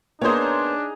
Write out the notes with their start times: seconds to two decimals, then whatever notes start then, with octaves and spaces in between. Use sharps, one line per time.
0.21 A#3 B3 D4 D#4 G#4 C5 C#5 A#5